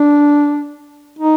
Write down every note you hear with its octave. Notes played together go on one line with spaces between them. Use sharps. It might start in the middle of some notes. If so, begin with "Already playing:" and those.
Already playing: D4
D#4